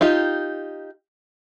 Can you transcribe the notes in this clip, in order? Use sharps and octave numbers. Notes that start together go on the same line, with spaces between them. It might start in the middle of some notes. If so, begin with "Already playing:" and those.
D#4 F4 G4